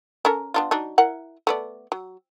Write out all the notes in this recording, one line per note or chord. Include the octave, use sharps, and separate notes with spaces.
C#4 A4 A#4
B3 D4 F4
F#3 D4 D#4
E4 A#4 F#5
A3 B3 D5
F#3